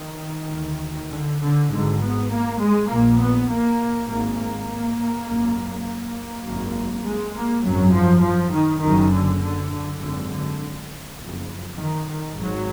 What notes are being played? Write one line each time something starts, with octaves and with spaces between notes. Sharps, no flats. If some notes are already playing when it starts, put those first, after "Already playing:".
Already playing: D#3
D2
D3
D3
G#1 G#2 D3
B3
A#3
G#3
A#1 A#2 A#3
B3
A#3
G#1 G#2 A#3
A#3
G#1 F#2
A#3
G#1 F#2
G#3
A#3
G#1 F#2 F#3
F3
F3
D#3
F#1 F#2 D#3
D3
D3
D3
G#1 F#2 D3
D3
F#1 F2
D#3
D#3
G#1 G#2 F#3